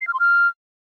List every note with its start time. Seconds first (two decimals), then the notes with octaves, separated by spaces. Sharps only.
0.01 C7
0.07 F6
0.14 C6
0.20 F6